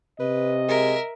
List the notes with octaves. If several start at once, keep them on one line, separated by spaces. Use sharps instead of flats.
C3 B4 D#5
G#3 A#4 E5